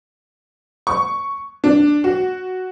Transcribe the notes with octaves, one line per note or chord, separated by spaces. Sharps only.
C#6
D4
F#4